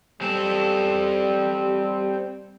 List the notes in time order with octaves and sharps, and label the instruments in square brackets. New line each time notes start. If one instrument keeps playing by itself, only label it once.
[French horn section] G3 [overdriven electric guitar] C4 A4